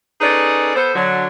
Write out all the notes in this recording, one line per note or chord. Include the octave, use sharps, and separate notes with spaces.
C#4 D#4 G#4 A4 B4 D5
B3 A4 C5
D3 F#3